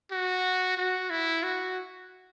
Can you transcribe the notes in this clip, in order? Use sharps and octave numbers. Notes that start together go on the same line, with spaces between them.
F#4
F#4
E4
F#4